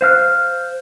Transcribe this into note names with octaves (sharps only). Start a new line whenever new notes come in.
C5 F5 F6 F#6